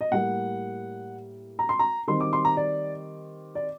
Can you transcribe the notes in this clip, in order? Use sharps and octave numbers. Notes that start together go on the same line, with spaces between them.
D#5
A2 G3 A#3 F#5
A#5
C6
A#5
D#3 G3 C4 C6
D6
C6
A#5
D5
D5